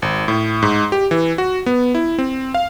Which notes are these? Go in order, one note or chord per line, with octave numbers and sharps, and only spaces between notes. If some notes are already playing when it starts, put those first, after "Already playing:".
G#1
A2
G#2
G4
E3
F#4
B3
E4
C4
F5